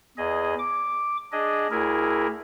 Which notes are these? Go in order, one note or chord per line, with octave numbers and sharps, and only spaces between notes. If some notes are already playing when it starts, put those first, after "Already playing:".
E2 G#4 D#5
D6
D4 G#4 D#5
D2 E4 G#4 A#4